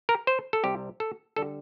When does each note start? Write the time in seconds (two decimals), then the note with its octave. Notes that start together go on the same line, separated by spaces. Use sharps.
0.09 A#4
0.27 C5
0.53 A4
0.64 C2 C3 G3 G4
1.00 A4
1.36 D3 G3 A4